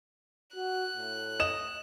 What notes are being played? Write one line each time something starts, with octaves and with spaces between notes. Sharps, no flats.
F#4 F#6
A2
D#5 E7